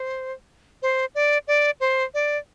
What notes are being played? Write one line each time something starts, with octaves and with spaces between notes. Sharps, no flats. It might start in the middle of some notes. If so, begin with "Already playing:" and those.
Already playing: C5
C5
D5
D5
C5
D5